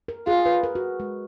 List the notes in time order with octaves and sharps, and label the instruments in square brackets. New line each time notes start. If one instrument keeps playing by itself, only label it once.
[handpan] A#4
[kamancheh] F4 [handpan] G#4
[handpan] B4
A#4
F#4
G#3